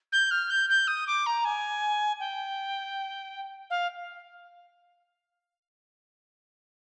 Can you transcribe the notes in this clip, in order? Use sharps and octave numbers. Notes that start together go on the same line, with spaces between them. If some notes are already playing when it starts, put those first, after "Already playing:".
G6
F6
G6
G6
D#6
D6
A#5
G#5
G5
F5